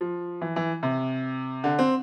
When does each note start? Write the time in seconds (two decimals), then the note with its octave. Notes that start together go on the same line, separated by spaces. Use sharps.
0.01 F3
0.41 E3
0.56 E3
0.83 C3
1.64 D3
1.79 C4